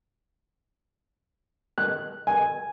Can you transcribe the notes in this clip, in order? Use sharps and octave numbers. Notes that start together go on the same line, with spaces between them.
F#6
G#5